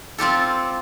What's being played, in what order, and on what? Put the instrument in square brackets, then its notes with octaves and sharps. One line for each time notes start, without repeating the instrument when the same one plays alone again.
[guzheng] C4 F4 G4 A4